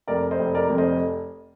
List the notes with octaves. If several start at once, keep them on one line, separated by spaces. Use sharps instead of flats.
F1 A#4 D5
C5 D#5
F1
A#4 D5
F2
C5 D#5